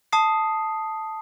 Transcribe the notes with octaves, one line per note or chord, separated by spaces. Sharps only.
A5 D#6 C7